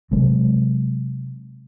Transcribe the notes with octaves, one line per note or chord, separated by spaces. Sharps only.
C3 F#3 G#3 C4